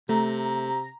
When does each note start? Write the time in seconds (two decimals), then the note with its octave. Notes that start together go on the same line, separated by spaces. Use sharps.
0.09 C3 A3 A#5